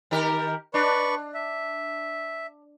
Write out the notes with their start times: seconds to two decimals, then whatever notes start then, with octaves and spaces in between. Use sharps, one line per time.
0.11 D#3 G4 A#4
0.74 D4 B4 D5 C#6
1.34 E5